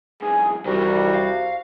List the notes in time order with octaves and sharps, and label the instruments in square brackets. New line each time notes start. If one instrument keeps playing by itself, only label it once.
[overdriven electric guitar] B1 G#2 [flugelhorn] G#4
[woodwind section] C2 C3 [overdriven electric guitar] D#3 E3 [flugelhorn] G3 [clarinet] F#4
[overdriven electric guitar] F5